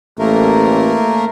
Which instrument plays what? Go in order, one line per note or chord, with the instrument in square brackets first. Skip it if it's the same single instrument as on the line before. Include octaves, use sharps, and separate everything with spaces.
[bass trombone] A1 [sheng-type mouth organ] A3 A#3 A#4